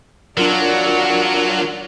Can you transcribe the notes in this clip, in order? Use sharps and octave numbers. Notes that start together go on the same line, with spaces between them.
F#3 D4 F4 A#4 D5 F#5